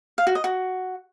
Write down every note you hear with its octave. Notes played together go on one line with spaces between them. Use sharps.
F5
F#4
D#5
F#4